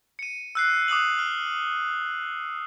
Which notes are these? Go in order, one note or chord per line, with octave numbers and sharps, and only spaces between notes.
C#7 D#7
E6 F#6 C7
D6 D#6 F#6 F#7
F6